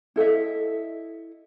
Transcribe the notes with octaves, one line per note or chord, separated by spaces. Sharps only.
E4 A4 D#5 E5